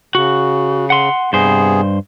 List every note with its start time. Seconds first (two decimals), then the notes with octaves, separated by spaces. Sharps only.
0.15 C#3 F#4
0.90 F#5 C6
1.33 G2 C3 B3 G#4 C5